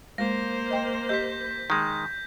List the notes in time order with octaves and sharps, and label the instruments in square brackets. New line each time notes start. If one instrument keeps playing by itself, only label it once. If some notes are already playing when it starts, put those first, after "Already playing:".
[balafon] G#3 [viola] A#3 C5 [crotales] A#6
[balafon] D#5 G5
[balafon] G4 D#5 [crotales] G6 B6
[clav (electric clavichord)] D#3 G#3 [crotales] G6